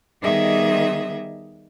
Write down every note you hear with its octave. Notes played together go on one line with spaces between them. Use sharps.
D#3 G3 B3 G#4 D#5 E5